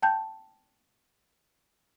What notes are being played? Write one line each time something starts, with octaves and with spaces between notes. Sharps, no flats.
G5 A5 G6